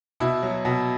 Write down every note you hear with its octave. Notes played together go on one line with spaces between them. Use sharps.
B2 E4
F#3
B2